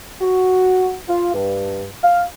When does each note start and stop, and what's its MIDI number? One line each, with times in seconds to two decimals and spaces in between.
0.20 0.92 66
1.08 1.29 65
1.34 1.83 43
2.02 2.22 77